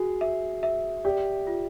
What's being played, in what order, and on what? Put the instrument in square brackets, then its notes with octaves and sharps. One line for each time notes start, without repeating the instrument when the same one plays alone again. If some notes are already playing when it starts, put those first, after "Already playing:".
Already playing: [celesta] F#4 [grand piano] G#4
[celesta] E5
E5
[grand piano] G4 [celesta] D5
[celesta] F4